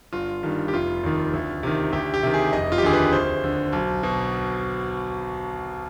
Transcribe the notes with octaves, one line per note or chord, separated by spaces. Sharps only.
G1 F4
G2 D#3
G4
F1 F4
D#2 D#3
D2
C3 D#3
D2 G4
G4
C3 D#3
G#4
F1 D#5
F4
G4
D#2 D3 G#4
B4
D2 C5
D3
B1
B2